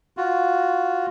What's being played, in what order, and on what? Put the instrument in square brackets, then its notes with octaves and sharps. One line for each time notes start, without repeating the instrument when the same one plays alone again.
[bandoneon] F4 F#4